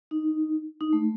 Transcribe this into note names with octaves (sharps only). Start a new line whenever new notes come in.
D#4
D#4
A3